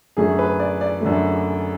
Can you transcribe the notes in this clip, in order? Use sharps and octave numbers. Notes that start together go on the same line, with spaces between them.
F#2 D3 A3 G#4
B4
D5
D5
F#2 D3 A3